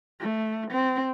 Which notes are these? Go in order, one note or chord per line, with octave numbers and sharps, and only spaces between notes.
A3
C4